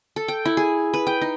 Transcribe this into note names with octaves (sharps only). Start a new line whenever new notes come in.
A4
G5
E4
G#4
B4
G5
D#4